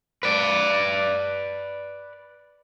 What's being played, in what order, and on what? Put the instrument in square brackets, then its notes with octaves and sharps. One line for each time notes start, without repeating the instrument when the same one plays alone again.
[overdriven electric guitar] B4 D5